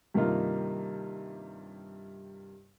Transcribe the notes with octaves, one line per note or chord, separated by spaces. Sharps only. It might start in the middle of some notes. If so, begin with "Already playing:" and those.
G2 C3 D#3 A#3 D#4 F4